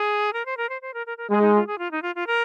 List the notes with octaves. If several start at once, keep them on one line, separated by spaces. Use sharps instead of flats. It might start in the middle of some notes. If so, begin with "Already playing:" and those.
Already playing: G#4
A#4
C5
A#4
C5
C5
A#4
A#4
A#4
G#3 G#4
D#4
F4
G#4
F4
D#4
F4
F4
A#4